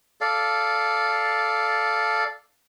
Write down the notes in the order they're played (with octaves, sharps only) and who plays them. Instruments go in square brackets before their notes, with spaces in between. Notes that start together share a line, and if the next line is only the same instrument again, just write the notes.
[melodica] A4 D5 F5